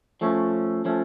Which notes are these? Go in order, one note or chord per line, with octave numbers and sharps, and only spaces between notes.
F3 A3 C#4
F3 A3 C#4